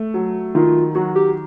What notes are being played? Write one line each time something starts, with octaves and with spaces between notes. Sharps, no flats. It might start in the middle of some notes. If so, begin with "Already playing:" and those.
Already playing: A3
F#3
D#3 F4
F#3 F#4
G4